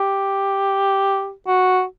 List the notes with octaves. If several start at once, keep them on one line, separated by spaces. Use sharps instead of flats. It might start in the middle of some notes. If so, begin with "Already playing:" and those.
Already playing: G4
F#4